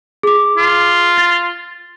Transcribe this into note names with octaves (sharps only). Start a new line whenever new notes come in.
G#4 D6
F4
A6